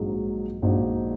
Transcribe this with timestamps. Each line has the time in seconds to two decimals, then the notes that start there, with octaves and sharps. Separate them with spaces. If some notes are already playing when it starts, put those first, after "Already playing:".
Already playing: A#1 G#2 F#3 D#4 G#4
0.62 A#1 A#2 G#3 D#4 F#4